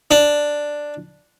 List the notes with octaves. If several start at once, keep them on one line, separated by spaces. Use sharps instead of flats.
D4